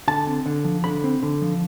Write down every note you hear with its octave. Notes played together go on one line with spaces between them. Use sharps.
D3 A5
C4
D3
F3
D3 B5
C4
D3
F3